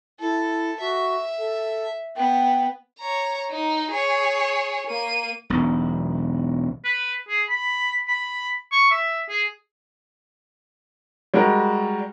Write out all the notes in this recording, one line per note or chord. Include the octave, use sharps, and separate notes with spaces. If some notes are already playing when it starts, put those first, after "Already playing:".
E4 A4
F#4 E5
A4
B3 G5
C#5 A#5
D#4
G#4 C#5
A#3 D#7
E1 B1
B4
G#4
B5
B5
C#6
E5
G#4
G3 G#3 F#4 A#4